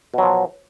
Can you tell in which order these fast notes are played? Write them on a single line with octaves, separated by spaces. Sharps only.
B2 F#3 F3